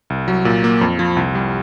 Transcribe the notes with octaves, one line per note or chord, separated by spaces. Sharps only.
C2
F#3
A#2
A#3
F2
F3
C2
G3